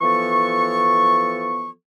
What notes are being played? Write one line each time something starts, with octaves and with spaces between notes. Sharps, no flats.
E3 F3 B3 A4 C#6